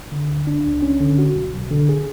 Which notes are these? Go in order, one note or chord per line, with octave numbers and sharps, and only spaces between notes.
D3
D2
D4
C#2
C#4
D3
F#4
B1
B1
D3
G#4